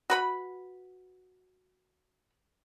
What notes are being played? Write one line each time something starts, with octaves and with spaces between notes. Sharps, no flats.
F#4 B4 B5